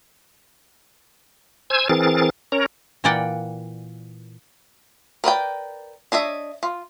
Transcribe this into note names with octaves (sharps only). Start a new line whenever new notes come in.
C5 G#5 E6 G#6
E3 C4 G#4 A#4 A6
C#4 A#4 C#5 A#5
A#2 E3 A#3 D5 F#5 G5
A#4 B4 D5 G5
D4 C#5 D#5 E5
F4